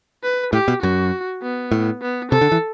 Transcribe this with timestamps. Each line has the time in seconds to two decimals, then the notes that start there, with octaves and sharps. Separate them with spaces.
0.23 B4
0.53 A2 G4
0.68 B2
0.82 F#2 F#4
1.42 B3
1.72 A2
2.01 B3
2.32 C3 A4
2.41 D3
2.52 E3